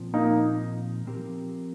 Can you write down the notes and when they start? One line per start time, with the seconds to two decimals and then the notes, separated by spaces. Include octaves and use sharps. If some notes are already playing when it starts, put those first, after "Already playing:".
Already playing: A#2 F3 C4
0.14 A#3 D#4
1.06 F3 C4 G4 A#4